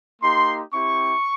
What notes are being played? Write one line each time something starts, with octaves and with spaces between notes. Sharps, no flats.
A#3 D#4 G4 C6
C4 E4 G4 C#6